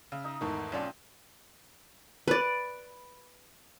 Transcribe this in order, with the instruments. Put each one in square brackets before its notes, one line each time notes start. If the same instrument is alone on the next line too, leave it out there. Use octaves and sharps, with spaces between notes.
[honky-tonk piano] C#3 [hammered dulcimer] E5
[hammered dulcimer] D#4 D#5
[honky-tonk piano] E2 G#2 D#3 [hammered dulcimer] A3
[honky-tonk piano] B1 C#4 D5 [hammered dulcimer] F3 C4
[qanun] B4 D5